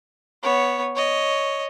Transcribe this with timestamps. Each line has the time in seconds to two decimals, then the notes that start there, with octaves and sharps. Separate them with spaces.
0.43 B3 C#5
0.95 C#5 D#5